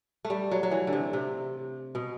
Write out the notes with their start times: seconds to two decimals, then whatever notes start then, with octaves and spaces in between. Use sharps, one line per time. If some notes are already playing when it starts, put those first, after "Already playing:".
0.25 A3
0.30 G3
0.51 F#3
0.63 F#3
0.71 E3
0.87 D3
0.93 C3
1.13 C3
1.95 B2